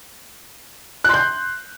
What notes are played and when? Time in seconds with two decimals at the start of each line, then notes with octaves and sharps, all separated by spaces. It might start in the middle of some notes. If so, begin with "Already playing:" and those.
1.04 F#6
1.09 C6
1.14 G6